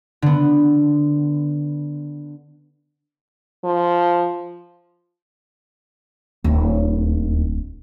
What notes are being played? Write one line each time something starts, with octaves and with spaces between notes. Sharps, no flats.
D3 B3
F3
D1 D#2